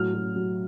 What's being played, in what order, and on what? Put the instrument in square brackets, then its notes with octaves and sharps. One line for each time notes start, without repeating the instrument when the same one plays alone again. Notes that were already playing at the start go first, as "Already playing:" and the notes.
Already playing: [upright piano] A2 F#3 F6
F#3
F#3